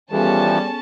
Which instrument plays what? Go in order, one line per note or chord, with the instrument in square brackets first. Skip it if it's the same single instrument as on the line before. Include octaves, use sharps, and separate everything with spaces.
[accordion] E3 F3 [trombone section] G3 [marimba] B3 G#4 A4 [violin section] C#4 A5